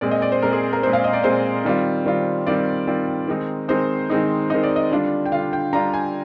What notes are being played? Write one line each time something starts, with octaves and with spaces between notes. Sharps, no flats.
A#2 G#3 C4 D5
D#5
D5
C5
A#2 G#3 C4 A#4
G#4
A#4
A#2 G#3 C4 C5
F5
D#5
D5
A#2 G#3 C4 C5
D#3 G3 C4 F4
D#3 G3 C4 F4
D#3 G3 C4 F4 D5
D#3 G3 C4 F4
D#3 G#3 C4 D#4
D#3 G#3 C4 D#4 C5
D#3 G#3 C4 D#4
D#3 G#3 C4 D#4 D#5
D5
D#5
D3 G3 D4 F4
G5
D3 G3 D4 F4 F5
G5
D3 G3 D4 F4 A#5
G#5